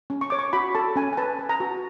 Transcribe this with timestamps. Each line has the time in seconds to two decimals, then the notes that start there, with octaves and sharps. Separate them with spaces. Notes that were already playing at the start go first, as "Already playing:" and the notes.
0.10 C#4
0.21 C#6
0.30 C#5 D6
0.39 C#6
0.53 F#4 B5
0.75 A4 A5
0.96 C#4 G#5
1.13 G#5
1.17 B4 A5
1.39 B4
1.49 A#5
1.60 F#4